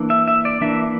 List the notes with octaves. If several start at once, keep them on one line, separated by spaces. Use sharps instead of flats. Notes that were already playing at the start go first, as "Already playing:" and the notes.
Already playing: E3 A#3 D4
E5
E5
D5
E3 A#3 D4 E5